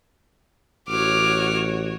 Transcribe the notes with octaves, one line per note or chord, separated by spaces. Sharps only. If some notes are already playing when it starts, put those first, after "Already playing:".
A1 F#4 C#5 D6 F6